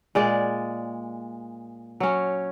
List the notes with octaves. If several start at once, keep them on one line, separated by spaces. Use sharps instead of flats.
A#2 G#3 D5
F#3 C#4